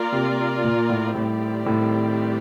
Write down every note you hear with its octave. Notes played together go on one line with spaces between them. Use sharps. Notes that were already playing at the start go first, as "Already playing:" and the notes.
Already playing: A#3 F4 A#4 D5
C3
A#2
A2
A2 D#3 G3 C4 G4 D5
A2